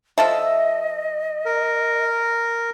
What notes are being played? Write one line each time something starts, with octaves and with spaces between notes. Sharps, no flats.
F3 A4 D#5 E5
A#4